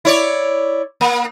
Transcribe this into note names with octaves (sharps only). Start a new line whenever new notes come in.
E4 C#5 D5
A#3